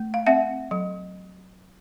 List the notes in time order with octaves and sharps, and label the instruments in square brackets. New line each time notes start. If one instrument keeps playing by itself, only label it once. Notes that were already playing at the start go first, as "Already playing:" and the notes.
Already playing: [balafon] A3
F5
C4 E5 F#5
F#3